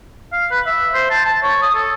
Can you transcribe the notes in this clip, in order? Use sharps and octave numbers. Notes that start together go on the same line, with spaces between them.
F5
B4
E5
C5
A5
A5
C#5
D#6
A4